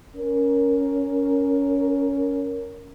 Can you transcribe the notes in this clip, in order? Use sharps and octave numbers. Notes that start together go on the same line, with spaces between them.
C#4 A#4